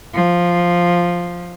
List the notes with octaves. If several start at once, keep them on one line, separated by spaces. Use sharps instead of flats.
F3